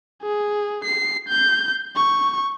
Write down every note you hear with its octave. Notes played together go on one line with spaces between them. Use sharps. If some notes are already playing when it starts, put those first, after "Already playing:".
G#4
C7
G6
C#6